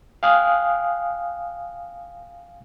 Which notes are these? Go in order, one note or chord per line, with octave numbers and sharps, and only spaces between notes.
F5 G5 G#5 D#6 F6 F#6